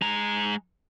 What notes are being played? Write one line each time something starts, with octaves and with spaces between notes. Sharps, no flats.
G#3 A#5